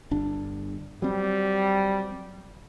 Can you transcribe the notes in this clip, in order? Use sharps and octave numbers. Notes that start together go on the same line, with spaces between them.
G1 D4
F#3 G3 C4